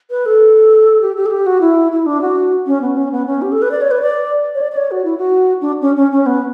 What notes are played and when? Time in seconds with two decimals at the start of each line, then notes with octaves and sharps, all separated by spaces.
0.11 B4
0.26 A4
1.02 G4
1.17 G4
1.26 A4
1.31 G4
1.46 F#4
1.61 E4
1.92 E4
2.06 D4
2.21 F#4
2.67 C#4
2.81 B3
2.97 C#4
3.12 B3
3.26 C#4
3.42 G4
3.52 A4
3.62 B4
3.71 D5
3.81 C#5
3.91 B4
4.02 D5
4.55 C#5
4.61 D5
4.72 D5
4.77 C#5
4.91 F#4
5.05 E4
5.18 F#4
5.61 D4
5.82 C#4
5.96 C#4
6.12 C#4
6.26 B3